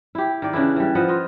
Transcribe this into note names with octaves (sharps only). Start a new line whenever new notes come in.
E4 G4
D#3 D5
C#3 E3 D4 E4
E3 G3
F3 B4 D#5 F#5
F4 D#5